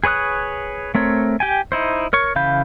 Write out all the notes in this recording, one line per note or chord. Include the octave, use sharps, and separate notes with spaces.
G#4 B4 C#5 D#6 F#6
A3 C4 A#4 C#5
G4 G5 G#5
D#4 E4 C5
A#4 C#5 C#6
C#3 E3 F5 B5 G6